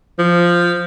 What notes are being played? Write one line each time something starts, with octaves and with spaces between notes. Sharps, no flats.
F3